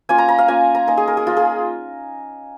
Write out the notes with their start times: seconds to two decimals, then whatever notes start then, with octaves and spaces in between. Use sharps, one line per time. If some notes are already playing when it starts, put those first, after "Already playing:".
0.09 A#3 C#4 F4 G#5
0.18 A#5
0.28 A#5
0.39 F5
0.48 A#3 C#4 F4 G#5
0.75 A#5
0.87 A#3 D#4 G#5
0.97 G#4
1.08 A#4
1.17 G#4
1.27 A#3 D#4 F4
1.37 G#4